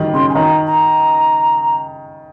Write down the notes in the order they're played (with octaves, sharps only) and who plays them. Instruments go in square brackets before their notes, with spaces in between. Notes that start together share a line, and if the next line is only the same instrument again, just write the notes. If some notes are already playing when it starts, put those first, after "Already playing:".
Already playing: [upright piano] D#3 G3
[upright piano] C#3 [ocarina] C6
[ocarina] G#5
[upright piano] D#3 [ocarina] A#5
[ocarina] A#5